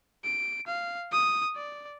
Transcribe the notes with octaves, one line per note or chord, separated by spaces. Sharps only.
D7
F5
D#6
D5